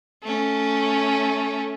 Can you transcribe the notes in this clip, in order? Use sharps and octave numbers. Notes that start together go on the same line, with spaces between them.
A3 C#4